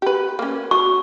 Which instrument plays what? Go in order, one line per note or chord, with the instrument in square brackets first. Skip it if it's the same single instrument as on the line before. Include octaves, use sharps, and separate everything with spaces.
[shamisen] G4 B4
A#3 C#4
[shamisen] F#3 [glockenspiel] C#6